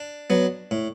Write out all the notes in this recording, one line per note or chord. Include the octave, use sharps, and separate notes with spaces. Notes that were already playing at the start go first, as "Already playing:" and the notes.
Already playing: D4
F#3 B3
A2